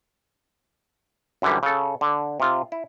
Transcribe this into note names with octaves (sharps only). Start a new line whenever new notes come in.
F#2 D3 E3 G3
C#3 A4
D3
C3 F4
E4